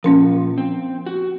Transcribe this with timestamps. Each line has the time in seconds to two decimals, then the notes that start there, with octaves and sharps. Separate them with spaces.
0.04 A#2 F3 A#3 C#4 A#4
0.58 C4
1.06 F#4